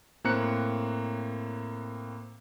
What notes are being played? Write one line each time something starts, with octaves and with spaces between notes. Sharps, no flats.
A2 A#3 C4 A#5 F#6 C#7